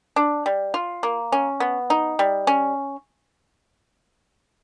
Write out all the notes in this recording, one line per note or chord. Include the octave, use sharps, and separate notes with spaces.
D4
G3
F4
A#3
C#4
B3
D#4
G3
C#4